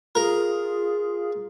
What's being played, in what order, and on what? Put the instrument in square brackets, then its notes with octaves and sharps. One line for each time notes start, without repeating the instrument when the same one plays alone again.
[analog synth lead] F4 [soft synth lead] G#4 [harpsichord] A#4